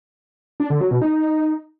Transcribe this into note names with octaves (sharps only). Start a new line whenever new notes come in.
D4
D3
F#3
B2
D#4